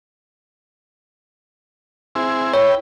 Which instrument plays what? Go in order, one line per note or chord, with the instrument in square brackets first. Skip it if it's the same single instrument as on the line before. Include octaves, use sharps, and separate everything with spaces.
[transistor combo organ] C4 E4 G#4
[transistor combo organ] E4 B4 G5 [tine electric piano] C#5